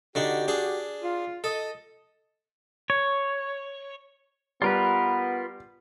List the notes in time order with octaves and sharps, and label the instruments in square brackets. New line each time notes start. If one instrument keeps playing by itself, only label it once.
[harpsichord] D3 D4 D#4 [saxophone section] F#4 G4
[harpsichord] D4 G#4
[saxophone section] F4
[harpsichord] A4 [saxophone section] D#5
[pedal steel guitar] C#5
[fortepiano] G3 [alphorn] B3 [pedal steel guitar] F4 A#4 B4